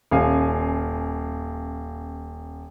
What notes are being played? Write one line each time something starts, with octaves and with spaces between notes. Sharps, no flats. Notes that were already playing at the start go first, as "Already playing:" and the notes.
D#1 F5 G#5